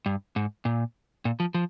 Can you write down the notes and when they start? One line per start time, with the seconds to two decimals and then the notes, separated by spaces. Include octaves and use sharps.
0.06 G2
0.36 G#2
0.65 A#2
1.25 A#2
1.40 F3
1.54 F3